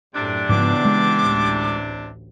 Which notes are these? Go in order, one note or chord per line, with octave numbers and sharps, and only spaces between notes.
F#2 A2 C3 D4
G#2 C#3 E3 F3 B3 D6
G#3
A1 D2